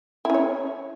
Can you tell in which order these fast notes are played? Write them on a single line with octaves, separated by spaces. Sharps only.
E4 C#4 C#5